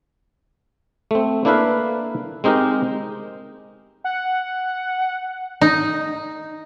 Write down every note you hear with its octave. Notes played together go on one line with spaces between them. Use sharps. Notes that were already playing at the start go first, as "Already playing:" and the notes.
A3 C4
A#3 D4 E4 A4 B4 F5
G#3 C4 D#4 G4 A#4
F#5
D#4